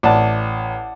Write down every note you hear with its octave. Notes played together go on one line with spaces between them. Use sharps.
A1 D5 F#5 A5